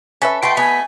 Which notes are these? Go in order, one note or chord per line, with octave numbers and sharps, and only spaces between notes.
C#4 A4 B4 E5
B2 A3 B4 G5 C6
B3 G#5 B5